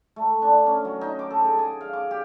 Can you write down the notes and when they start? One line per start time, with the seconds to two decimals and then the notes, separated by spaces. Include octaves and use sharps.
0.16 A3
0.42 D4
0.66 C#4
0.85 F#3
1.01 D#4
1.19 D6
1.30 A4
1.44 G#4
1.59 G#4
1.81 F5
1.93 D6
2.11 G4